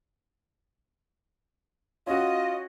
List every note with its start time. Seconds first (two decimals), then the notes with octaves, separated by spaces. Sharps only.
2.07 C#4 F4 F#4 D#5